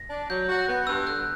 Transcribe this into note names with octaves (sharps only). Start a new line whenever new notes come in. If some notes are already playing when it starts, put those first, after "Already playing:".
Already playing: A#6
D4
F#3 G6
F#4
F#6
B3
G2 E6
D3 F#6